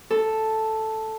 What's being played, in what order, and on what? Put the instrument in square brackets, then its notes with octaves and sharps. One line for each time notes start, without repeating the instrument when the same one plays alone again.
[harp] A4